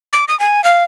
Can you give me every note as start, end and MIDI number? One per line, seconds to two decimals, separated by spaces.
0.13 0.25 86
0.28 0.38 87
0.40 0.63 80
0.64 0.84 77